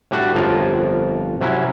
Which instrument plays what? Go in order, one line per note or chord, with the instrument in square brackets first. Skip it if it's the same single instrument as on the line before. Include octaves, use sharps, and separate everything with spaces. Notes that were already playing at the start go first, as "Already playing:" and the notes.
[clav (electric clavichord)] A2 G3 D4 F#4
G1 F2 F3 F4 A#4 C#5
C3 F#3 C#4 E4